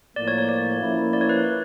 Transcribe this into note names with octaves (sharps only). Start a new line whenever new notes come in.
A2 F3 A#3 D5
C#5
C#5
D5
F3 A#3 C#4 E4
D5
C#5
B4